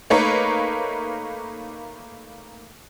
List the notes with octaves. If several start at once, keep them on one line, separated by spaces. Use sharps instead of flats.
A3 A#3 D#4 A#4 B4 C#5